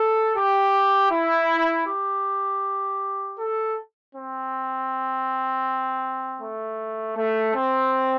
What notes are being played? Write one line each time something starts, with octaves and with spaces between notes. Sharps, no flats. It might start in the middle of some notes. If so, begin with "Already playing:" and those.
Already playing: A4
G4
E4
G4
A4
C4
A3
A3
C4